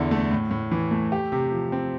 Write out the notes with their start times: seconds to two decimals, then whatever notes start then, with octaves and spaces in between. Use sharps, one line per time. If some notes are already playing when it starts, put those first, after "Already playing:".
Already playing: E2 D3 E4
0.11 A3
0.31 A2
0.51 A2
0.71 E3
0.91 A3
1.12 G4
1.32 C3
1.52 F3
1.72 C4